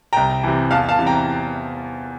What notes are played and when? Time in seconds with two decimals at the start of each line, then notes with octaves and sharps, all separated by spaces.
0.13 C2 G5 A#5
0.43 C3 E3
0.71 E2 F5 A5
0.89 F5 A5
0.98 C3 E3
1.06 G5 A#5